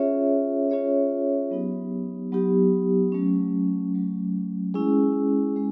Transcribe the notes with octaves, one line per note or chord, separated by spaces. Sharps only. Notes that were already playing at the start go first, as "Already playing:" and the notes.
Already playing: C#4 F4 G#4 C#5 E5
C#4 F4 G#4 C#5 E5
F#3 B3 D#4 G4
F#3 B3 D#4 G4
F#3 A3 C#4
F#3 A3 C#4
G#3 C#4 E4 G#4
G#3 C#4